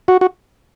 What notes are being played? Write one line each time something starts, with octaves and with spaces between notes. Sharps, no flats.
F#4
F#4